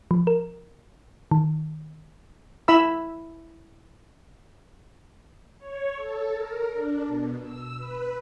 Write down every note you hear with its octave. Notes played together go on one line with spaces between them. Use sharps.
F3
A#4
D#3
E4 E5 B5 E6
C#5
A4
A#4
D4
B2
E6
B4